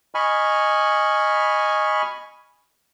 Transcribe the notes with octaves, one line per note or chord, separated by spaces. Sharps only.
D#5 G#5 B5 C#6 F6